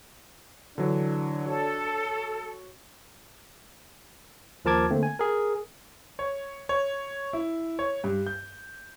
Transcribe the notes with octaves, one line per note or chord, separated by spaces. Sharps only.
D3 E3 F#3 D4
F#4 A4 C#5
D#2 F3 A#4 A5 D6 G#6
D3 A3 A#3 C4
G#5
G#4 A#4
C#5
C#5
E4
C#5
G2
G6